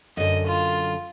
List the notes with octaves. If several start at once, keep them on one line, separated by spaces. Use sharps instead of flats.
F#2 D3 D#5
F4